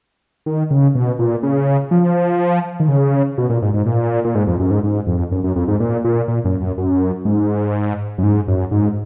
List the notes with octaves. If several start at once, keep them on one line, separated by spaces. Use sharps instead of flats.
D#3
C#3
B2
A#2
C#3
F3
D#3
C#3
B2
A#2
G#2
G#2
A#2
A#2
G#2
F2
F#2
G#2
G#2
F2
F#2
F#2
F2
G#2
A#2
A#2
A#2
F#2
F#2
F#2
G#2
F#2
G#2
F#2
G#2